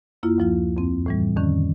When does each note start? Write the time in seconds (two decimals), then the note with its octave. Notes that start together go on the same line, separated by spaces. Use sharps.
0.23 F#2 A#3 E4 F4
0.38 D2 F3 F4
0.77 F2 C4
1.06 A2 E3 G3
1.37 F2 D3 D#3 C#4